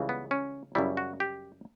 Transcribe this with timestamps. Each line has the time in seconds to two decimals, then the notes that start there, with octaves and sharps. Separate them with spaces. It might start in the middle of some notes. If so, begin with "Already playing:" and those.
Already playing: C#2 C#3 E3 G3
0.09 B3
0.31 C#4
0.75 F#2 C#3 G3 E4
0.97 F#4
1.20 G4